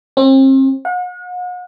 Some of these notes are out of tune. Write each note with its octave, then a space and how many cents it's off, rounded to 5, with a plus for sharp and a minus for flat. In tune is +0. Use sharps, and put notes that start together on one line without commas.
C4 +40
F#5 -45